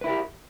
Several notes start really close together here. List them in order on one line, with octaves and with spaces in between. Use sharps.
B4 E4 A#4 G4